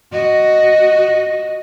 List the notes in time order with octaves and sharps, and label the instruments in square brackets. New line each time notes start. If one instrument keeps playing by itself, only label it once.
[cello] F#4 D#5